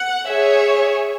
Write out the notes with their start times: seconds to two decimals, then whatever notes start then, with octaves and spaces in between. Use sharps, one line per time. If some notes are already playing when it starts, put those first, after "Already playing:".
Already playing: F#5
0.27 G#4 C#5 E5